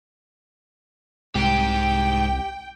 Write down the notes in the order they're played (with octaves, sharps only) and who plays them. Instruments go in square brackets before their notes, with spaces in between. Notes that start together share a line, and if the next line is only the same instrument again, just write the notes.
[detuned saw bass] C2 [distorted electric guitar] G#2 [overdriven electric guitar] G4 [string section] G5